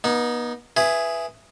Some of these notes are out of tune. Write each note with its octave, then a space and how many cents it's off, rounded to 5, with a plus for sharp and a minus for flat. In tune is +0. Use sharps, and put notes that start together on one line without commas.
B3 -35 D#4 +0
E4 +15 G#4 +0 B4 +0